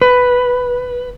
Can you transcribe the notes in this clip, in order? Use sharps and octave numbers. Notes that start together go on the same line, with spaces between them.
B4